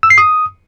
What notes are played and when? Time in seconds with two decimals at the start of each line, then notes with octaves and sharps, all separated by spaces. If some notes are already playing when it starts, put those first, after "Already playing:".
0.03 E6
0.10 C7
0.18 D#6